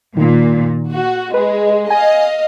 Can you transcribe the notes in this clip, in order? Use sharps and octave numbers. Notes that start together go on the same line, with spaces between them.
A#2 D#3
F#4
G#3 B4
D#5 F5 G#5